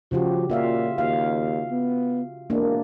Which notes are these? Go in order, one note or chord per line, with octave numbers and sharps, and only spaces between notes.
C#3 F3 F#4 G4
A#2 F4 E5 F5
D#2 F5
B3
E1 A#3 D4